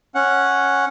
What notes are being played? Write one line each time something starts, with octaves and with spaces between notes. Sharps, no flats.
C#4 F#5